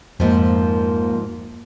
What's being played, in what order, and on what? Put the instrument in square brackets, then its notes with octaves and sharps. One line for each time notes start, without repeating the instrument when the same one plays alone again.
[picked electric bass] F2 [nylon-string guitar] G#2 F3 [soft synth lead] A#3